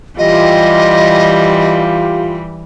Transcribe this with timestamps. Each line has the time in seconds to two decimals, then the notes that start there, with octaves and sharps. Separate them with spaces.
0.19 E3 G3 F4 G4 D#5